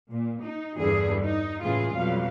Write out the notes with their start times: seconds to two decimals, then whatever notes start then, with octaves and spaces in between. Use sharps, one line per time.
0.11 A#2
0.42 D#4
0.78 E2 G2 D3 G3 G#4
1.24 D#4
1.63 A2 C#3 E3 G#3 F4 G#4
1.95 F2 B2 F#3 G3 F5